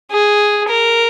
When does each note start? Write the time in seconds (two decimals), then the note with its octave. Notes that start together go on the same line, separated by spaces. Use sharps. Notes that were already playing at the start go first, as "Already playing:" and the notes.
0.11 G#4
0.68 A#4